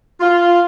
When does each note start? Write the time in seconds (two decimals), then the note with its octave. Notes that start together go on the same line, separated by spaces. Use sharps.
0.21 F4